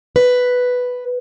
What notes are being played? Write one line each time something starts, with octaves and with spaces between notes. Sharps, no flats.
B4